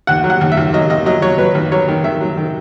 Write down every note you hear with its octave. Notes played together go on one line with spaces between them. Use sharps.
D#2 F#5
F#3
F#5
D#2
E5
D#2
F#3 D#5
D#2 D#5
F#3 D#5
F#3 C#5
F#3 B4
D#2
F#3 C#5
D#3
D#3 E5
F#3
D#3